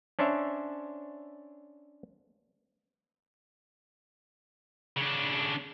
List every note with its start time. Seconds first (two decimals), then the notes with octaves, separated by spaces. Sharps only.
0.19 C#4 D4 C5 C#5 E5
4.97 C#3 D4